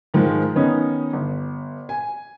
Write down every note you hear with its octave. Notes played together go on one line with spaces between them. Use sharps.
G#2 D#3 F3 G#3
D#3 B3 C#4 D#4
G1
G#5